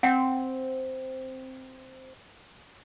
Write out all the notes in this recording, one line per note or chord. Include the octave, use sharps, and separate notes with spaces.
C4 F#5 G5